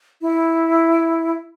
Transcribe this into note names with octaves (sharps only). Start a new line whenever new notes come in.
E4